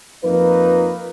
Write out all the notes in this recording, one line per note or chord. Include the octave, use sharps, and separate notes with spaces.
F2 F3 A#3 D#4 B4